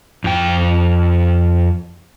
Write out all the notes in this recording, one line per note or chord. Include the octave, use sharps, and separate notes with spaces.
F2 G5